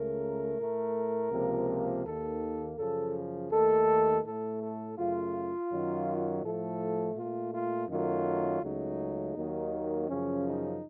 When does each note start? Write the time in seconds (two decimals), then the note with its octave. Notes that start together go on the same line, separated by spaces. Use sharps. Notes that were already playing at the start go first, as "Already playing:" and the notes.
Already playing: C#2 C#3 A3 A#4
0.58 A2 A3
1.31 C#2 C3 F3 A#3
2.04 D#2 D#3 A#3 A4
2.77 F#2 C#3 F3 A4
3.51 D#2 D#3 A3 A4
4.23 A2 A4
4.28 A3
4.60 A4
4.96 F#2 C#3 A3 F4
5.70 F#2 D#3 F#3
6.43 A2 F3 A3 A4
7.16 A#2 A3 F4
7.52 F4
7.88 F#2 D#3 F#3 A3 F4
8.61 C#2 C#3 F#3 A3 D#4
9.35 D#2 D#3 F#3 A#3
10.08 F#2 C#3 F3 C#4
10.45 D#4